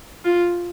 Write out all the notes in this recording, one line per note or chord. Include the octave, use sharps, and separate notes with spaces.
F4